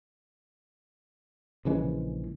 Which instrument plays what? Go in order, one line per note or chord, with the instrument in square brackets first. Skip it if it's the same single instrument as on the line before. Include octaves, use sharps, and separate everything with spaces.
[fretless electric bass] A#1 C#3 E3 G#3